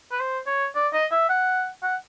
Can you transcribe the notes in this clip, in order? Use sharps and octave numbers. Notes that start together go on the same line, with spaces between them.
B4
C5
C#5
D5
D#5
E5
F#5
F#5